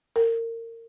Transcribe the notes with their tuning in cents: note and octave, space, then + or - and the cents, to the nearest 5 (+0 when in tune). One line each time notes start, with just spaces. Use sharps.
A#4 -30